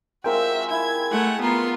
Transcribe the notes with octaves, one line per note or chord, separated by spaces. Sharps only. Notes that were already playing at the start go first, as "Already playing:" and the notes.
G#3 C4 F4 F#4 A#4 E5 G5
E4 G#6
A3 F#5
B3 F4 A#5 C6